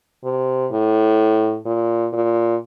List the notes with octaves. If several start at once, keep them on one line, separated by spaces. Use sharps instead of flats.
C3
A2
A#2
A#2